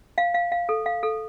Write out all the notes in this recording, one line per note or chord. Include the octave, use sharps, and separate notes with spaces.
F5
F5
F5
A4
F5
A4